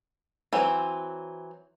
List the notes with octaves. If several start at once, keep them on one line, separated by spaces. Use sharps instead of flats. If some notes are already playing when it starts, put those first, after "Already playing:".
E3 F#3 C4